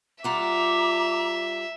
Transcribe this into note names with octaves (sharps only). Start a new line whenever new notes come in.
G3 F4 E5 F#5 A#5 D6